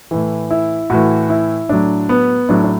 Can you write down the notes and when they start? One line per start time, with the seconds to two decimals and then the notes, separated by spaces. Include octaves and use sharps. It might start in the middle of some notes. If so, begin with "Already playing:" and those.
0.11 A2 E3
0.51 E4
0.90 A2 E3 F#4
1.30 E4
1.69 A2 F#3 D4
2.09 B3
2.49 A2 F#3 D4
2.64 D4